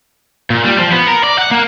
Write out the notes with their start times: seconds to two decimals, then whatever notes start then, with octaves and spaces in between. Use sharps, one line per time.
0.50 A#2
0.64 G3
0.79 F3
0.92 B3
1.08 A#4
1.24 D5
1.38 F#5
1.51 A#3